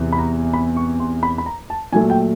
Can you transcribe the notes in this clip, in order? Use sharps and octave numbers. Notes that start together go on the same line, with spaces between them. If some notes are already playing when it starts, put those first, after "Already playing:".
Already playing: E2 C3 E3
B5
A#5
B5
C#6
C6
B5
B5
A#5
A5
A#2 F#3 A3 G#5
G5